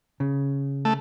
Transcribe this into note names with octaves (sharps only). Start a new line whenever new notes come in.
C#3
A3